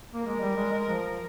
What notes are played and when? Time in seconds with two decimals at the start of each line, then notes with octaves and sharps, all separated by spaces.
0.13 A#3
0.23 G#3 A#4
0.40 G3
0.56 G#3
0.73 G#3
0.89 F3